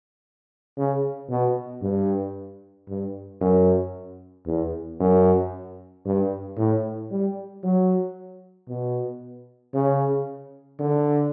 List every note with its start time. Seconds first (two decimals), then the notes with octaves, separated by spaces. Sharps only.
0.78 C#3
1.29 B2
1.83 G2
2.89 G2
3.41 F#2
4.46 E2
5.00 F#2
6.05 G2
6.57 A2
7.11 G3
7.63 F#3
8.68 B2
9.74 C#3
10.80 D3